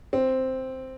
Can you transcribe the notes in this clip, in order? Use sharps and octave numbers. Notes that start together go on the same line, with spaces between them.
C4